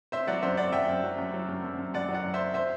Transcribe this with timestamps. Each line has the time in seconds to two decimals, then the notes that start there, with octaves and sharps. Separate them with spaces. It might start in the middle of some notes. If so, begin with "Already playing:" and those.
0.12 C4 C5 E5
0.27 F#3 D5 F#5
0.42 F#2 C5 E5
0.57 C4 D5 F#5
0.72 F#2 E5 G5
0.88 F#2
1.04 F#3
1.18 F#2
1.34 F#3
1.49 F#2
1.64 F#2
1.79 F#2
1.94 F#2 D5 F#5
2.08 F#3
2.14 D5 F#5
2.24 F#2
2.34 C4 C5 E5
2.54 C5 E5